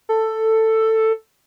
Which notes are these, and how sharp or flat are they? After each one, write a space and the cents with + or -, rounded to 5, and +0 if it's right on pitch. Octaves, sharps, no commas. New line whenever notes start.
A4 +10